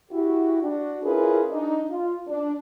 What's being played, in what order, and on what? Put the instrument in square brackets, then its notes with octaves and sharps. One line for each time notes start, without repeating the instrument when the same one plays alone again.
[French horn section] E4 F#4 G4
D4 F#4
C#4 E4 F4 G#4 A#4 B4
D4 D#4
F4
D4